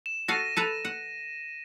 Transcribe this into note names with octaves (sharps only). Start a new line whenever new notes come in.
E7
F#4 A4 F5 A#6 D#7
A4 B4 A#5
F#5